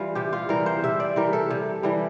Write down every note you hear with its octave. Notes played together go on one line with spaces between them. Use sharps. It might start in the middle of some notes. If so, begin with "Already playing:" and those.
Already playing: E3 G3 F4
C3 G4
F4
E3 G3 A#4
C5
C3 E5
D5
E3 G3 A#4
A4
C3
E3 G3